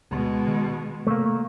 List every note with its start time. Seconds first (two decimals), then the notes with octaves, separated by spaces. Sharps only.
0.11 D2 B2 D3 G#3
0.48 D#3
1.07 C3 A3 A#3